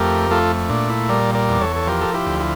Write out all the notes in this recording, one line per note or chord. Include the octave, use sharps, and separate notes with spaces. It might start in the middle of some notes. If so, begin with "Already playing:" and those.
Already playing: F2 A3 G4 A#4
A3 F4 A4
A#2 D4
E4
G3 A#4 D5
A#4 D5
E2
A4 C#5
A4
F3 G4 A#4
A4
E4 G4
D2
E4